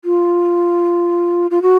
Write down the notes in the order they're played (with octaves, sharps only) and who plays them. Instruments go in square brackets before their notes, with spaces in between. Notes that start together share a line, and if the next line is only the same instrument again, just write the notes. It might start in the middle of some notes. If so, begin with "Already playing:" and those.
[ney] F4
F4
F#4